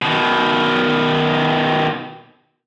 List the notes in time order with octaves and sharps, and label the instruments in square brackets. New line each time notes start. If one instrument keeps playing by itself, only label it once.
[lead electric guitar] B2 D#3